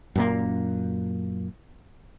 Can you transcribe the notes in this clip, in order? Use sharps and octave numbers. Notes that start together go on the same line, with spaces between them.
F#2 A#2 A#3